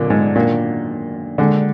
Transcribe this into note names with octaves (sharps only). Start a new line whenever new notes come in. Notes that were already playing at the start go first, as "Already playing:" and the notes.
Already playing: F#2 A#2 D3 D#3 F#3 B3
G#2
A#2 D#3 A#3 D4 F#4
D3 D#3 G#3 D#4 F#4